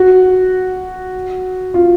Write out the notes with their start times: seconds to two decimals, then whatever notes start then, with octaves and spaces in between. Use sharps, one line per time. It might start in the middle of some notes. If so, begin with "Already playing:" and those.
Already playing: F#4
1.74 F4